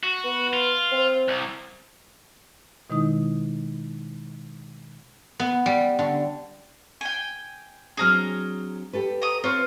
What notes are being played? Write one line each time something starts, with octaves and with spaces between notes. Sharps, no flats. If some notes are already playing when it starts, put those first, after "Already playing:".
F#4
B3
F4
C4
C2
B2 D#3 G#3 D#4 E4 D#6
B3
G3
D3
G5 G#5
F#3 C4 D4 G#4 A#5 F6
G4 A4 B4
A#5 D#6
C4 F4 B4 C#5